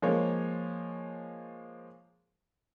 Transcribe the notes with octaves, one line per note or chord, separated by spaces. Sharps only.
F3 G#3 A#3 C#5